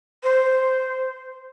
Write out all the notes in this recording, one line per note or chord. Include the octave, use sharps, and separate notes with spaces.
C5